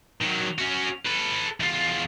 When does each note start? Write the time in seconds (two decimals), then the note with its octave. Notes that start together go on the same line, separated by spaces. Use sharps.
0.22 D#3 F#3
0.59 C#4 F#4
1.05 A4 B4
1.60 E2 F4